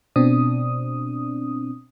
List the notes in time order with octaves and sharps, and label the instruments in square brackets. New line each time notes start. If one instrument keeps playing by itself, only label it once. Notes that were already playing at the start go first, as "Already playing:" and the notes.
[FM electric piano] B2 C4 D4 D#6